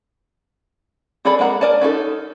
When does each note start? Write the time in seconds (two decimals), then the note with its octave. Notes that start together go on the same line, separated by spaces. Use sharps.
1.25 C4 G#4 A4 D5 B5
1.39 G#3 A#3 F#5 A#5
1.61 A#4 D5 G#5 A5
1.81 C#4 D#4 F4 A4